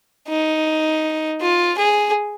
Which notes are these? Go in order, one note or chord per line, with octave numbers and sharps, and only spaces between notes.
D#4
F4
G#4